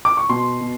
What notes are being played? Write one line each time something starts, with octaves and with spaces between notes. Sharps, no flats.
D6
C#6
B2 C6
B2